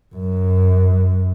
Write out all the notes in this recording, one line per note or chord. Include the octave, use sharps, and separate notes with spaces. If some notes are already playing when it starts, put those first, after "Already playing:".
F#2